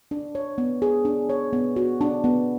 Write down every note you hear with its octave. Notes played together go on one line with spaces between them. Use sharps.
D4
C#5
B3
G#4
D4
C#5
B3
F#4
D4
B3